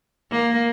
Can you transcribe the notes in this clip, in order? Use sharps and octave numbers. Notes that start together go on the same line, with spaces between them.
A#3